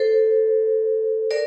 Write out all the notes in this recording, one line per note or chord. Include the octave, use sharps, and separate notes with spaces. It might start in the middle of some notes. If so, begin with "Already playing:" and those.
Already playing: A4 C5
A#4 D5